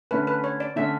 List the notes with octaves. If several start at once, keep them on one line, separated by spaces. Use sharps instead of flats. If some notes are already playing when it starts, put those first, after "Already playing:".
D3 A3 C#4 B4
B4
C#5
D5
D3 A3 C#4 E5